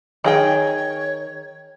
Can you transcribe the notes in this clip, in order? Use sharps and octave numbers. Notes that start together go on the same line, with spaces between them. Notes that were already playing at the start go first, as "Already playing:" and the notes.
D#3 G#4 C#5 G5